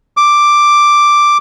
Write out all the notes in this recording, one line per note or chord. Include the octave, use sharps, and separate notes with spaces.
D6